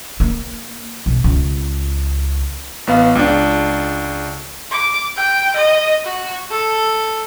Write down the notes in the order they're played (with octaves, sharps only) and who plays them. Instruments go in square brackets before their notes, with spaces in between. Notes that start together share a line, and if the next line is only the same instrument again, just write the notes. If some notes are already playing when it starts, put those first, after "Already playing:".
[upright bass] A#3
B1
C#2
[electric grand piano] A1 B3 F5
C#2 D4
[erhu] D6
G5
D#5
F#4
A4